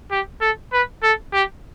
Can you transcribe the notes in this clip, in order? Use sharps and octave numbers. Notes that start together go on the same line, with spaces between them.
G4
A4
B4
A4
G4